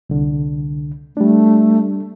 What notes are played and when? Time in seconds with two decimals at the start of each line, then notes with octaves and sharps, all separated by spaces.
0.10 C2 D3
1.17 G3 A3 D4